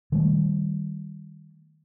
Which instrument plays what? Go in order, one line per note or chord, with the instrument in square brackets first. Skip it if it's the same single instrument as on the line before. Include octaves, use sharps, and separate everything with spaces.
[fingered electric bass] D#3 G3 A3